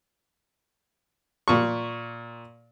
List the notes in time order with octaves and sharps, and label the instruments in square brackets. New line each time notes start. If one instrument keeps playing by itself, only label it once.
[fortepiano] A#2 C#6